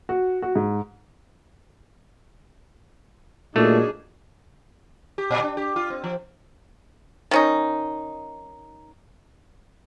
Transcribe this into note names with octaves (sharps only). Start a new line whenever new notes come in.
F#4
F#4
G#2
A#2 F#3 A3 D4 D#4 G#4
G4
A#2
D4
G4
F4
C4
F3
D#3 C#4 D#4